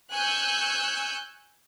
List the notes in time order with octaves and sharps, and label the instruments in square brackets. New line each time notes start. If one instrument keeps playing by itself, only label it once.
[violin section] G#5 C#6 E6 F#6 G6